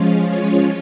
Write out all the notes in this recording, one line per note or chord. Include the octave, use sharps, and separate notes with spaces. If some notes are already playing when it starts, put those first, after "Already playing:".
Already playing: F3 G#3 C#4 F4
C#5